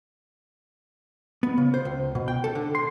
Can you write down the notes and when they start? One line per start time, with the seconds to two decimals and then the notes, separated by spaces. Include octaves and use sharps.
1.43 B3
1.58 C#3
1.74 C5
1.85 C#2
2.15 B2
2.28 G5
2.44 A4
2.55 D3
2.75 C6